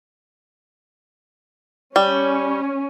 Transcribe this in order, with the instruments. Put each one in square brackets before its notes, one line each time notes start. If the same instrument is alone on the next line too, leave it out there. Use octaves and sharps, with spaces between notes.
[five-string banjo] G3 [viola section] C#4